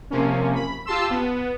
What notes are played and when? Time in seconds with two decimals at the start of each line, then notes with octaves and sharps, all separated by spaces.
0.10 C3 F3 A#3 C#4
0.54 B5
0.86 F4 G4 A5 C6 E6
1.10 B3